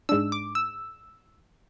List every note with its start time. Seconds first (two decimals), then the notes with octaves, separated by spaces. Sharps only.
0.09 G#2 G#3 D4 E6
0.32 D6
0.55 E6